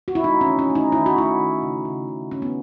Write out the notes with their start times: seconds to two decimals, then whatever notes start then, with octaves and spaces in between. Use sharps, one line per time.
0.08 F#4
0.15 E4
0.23 A3 D#4
0.41 C#4
0.47 D#3
0.59 C#4
0.70 A3
0.75 D#4
0.92 D#3 E4
1.06 F#4
1.16 A3 E4
1.40 D#3
1.62 C#3
1.85 C#3
2.08 C#3
2.31 C#3 C#4
2.42 B3